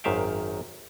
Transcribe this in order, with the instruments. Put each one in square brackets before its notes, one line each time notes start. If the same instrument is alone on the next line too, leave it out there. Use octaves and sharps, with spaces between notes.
[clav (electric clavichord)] G#1 F#2 D#3 E5 F5 G5